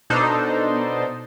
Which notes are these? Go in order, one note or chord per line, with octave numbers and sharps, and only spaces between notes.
B2 D4 D#4 A4 C5